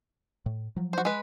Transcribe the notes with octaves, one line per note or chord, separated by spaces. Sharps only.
A2
F3 F#3
F#4 C5
G#3 B4